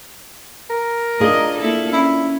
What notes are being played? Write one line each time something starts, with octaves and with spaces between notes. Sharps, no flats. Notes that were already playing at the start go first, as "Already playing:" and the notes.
A#4
D4 F4 G#4 D#5
A#3 E4 A4
C#4 E4